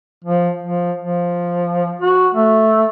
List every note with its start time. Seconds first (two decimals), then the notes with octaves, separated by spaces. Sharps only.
0.24 F3
0.63 F3
1.02 F3
2.02 F#4
2.34 A3